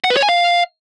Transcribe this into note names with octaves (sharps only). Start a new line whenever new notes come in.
F#5
B4
C#5
G#5
F5